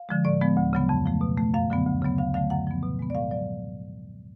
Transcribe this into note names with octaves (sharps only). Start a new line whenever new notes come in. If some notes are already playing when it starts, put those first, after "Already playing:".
Already playing: F5
D3 F3 G#3
A2 D5
F3 G#3 B3
D2
C#3 F#3 B3
F2
F3 A3
B2
A3
F#2 F5
D3 F#3 B3
D2
C#3 F#3 B3
D2 F5
D3 F#3 A3 F5
F#2 F#5
F3 B3
B2
G#3 B3
D5
A2 F5
F#3 D5